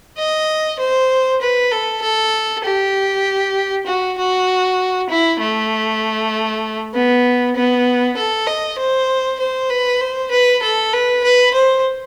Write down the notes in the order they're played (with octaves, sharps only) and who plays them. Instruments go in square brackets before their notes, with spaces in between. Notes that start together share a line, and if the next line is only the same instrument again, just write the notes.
[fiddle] D#5
C5
B4
A4
A4
G4
F#4
F#4
E4
A3
B3
B3
A4
D#5
C5
C5
B4
C5
B4
A4
B4
B4
C5